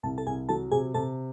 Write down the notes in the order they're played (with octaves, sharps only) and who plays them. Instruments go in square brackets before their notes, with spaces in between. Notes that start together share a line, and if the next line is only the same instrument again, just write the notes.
[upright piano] C2 [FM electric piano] A5
[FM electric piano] A4 A5
[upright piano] C2 [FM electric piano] G#4 G#5
[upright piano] F#3 [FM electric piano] A4 A5
[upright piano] C3 [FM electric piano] G#4 G#5
[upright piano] C3 [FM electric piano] A4 A5